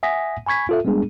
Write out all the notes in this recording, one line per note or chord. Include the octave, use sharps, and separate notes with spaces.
E5 F#5 G#5 D#6 A#6 B6
G#5 B5 C#6 G#6 B6
F4 A4 E5
G3 G#3 B3 D4 G#4